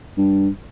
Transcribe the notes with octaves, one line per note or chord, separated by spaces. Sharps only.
G2